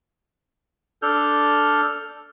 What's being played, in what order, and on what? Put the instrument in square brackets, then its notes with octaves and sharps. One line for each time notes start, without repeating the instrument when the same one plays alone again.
[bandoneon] D4 A4 F6 G6